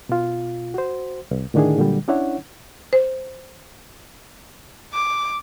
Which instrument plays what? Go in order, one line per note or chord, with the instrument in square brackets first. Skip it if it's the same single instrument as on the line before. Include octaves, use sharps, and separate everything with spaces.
[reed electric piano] B2 F4
F#4 C5
C2
A2 D3 D#3 D4 E4 G#4
A#2 D3 F#3 G3
C#4 D4 E4 C#5 F#5
[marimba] C5
[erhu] D6